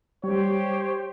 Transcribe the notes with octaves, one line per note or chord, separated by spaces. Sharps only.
G3 G4 C5 C#5